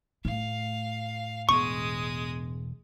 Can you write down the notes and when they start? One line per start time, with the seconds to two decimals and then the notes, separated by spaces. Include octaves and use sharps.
0.25 A2 F5
1.49 E1 G#3 B3 C#6 D#6